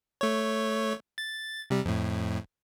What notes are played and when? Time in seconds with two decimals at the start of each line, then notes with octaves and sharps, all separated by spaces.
0.21 A3 C#5
1.18 A6
1.70 C3 G3
1.85 F2 A2